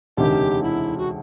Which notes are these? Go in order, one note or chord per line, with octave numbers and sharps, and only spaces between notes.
E1 D2 C3 D#3 G4
E4
F#4